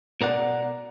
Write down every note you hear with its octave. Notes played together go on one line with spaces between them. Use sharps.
B2 A#4 D5 F#5